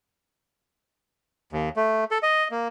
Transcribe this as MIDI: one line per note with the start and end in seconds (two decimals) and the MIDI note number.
1.53 1.69 39
1.76 2.04 57
2.11 2.18 69
2.23 2.48 75
2.51 2.68 58